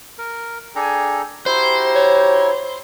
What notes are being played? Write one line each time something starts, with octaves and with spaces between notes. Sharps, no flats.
A#4
D4 G#4 A4 G5 G#5 A#5
E4 F#4 G4 C5 A#5
C#5